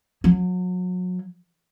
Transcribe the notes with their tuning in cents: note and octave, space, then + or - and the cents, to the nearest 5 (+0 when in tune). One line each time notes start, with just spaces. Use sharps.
F#3 -30